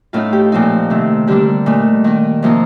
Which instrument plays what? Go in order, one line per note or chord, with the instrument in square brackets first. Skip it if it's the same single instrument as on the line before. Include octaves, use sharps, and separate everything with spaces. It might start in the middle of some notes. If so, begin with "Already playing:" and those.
[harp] A2 A3 D#4 F4
G4
A#2 F3 C4 D#4
C3 D#3 A3
D3 G3 A#3 D4 G4
A#2 A3 D#4
D#3 A#3 D#4
C3 F3 A#3 D#4